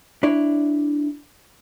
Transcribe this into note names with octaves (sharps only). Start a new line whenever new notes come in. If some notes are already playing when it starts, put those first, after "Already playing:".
D4 E4 C#5 D5